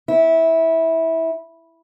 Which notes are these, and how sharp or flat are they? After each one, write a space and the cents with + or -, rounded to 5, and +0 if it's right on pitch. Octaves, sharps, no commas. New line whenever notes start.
E4 -15